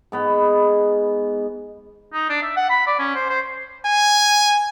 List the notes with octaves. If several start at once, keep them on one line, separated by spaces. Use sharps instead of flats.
G#2 B3 B5
D#4
D4
E5
F#5
B5
D5
C#4
C5
C5
G#5